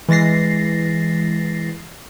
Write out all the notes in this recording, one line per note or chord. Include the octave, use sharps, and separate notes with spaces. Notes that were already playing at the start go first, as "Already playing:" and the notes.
E3 G#3 A6 A#6 C7